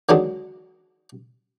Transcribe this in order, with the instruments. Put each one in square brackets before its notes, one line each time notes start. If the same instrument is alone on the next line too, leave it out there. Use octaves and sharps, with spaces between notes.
[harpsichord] D3 D#3 F#3 G#3 D4